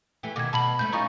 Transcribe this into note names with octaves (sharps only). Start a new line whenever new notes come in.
E3 A3 G4
B2 D#3 D6 G#6
B2 A5 B5 F#7
F#2 A3 C#4 G6
C#4 D#4 F4 A#5 C#6